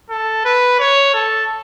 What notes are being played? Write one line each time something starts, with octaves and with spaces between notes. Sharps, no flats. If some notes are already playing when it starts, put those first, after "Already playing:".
A4
B4
C#5
A4